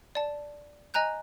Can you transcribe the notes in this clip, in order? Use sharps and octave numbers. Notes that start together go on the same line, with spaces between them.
D5 A5
D#5 G#5 A#5 F#6 G6